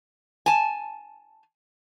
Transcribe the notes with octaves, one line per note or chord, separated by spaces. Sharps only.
G#5 A5